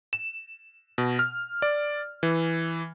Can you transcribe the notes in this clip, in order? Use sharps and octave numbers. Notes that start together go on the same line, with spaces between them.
E7
B2
F6
D5
E3